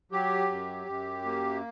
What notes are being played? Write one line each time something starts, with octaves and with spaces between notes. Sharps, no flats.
F#3 G4
F#2
F#2
A#3